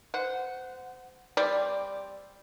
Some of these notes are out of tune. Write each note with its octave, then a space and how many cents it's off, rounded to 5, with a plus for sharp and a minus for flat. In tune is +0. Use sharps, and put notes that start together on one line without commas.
C5 -25 F#5 +0
G3 +10 C4 +0 D5 +0